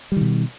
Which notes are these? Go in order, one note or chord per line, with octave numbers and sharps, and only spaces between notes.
B2 D#3 G3